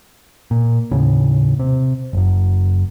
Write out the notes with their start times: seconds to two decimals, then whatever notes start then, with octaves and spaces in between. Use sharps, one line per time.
0.51 A#2
0.91 D#2 A2 C#3
1.59 C3
2.13 F#1 F#2